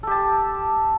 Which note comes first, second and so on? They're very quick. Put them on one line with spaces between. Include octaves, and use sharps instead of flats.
A4 G4 A5